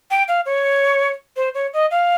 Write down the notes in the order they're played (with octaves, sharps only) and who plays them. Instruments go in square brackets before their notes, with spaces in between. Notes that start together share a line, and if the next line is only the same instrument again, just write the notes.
[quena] G5
F5
C#5
C5
C#5
D#5
F5